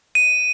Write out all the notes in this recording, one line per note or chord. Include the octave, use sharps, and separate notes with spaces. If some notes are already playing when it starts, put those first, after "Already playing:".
D#7